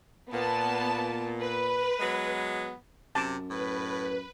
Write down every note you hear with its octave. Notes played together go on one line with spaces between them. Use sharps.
A#2 B3 A5
B4
F#3 G#3 B3
F#2 C3 A5 D6
A2 B4